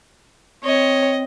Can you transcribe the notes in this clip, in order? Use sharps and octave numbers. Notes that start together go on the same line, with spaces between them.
C4 C#5 D#5